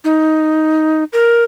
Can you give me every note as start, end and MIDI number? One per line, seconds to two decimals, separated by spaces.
0.04 1.04 63
1.13 1.44 70